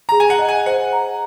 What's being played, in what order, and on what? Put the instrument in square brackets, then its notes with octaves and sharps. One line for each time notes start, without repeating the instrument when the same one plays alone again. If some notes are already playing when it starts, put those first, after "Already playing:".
[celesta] G#4 [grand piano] A#5
[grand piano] G#5
F#5
[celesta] D#5
[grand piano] G#5
[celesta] C5 [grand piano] F#5
[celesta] A#5